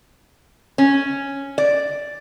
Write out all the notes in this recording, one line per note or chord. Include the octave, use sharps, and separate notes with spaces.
C#4
D5